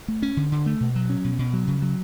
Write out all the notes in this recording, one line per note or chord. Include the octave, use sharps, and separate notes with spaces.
A3
C#4
D3
D3
A3
B2
F#3
C#4
B2
B2
F#3
C#3
F#3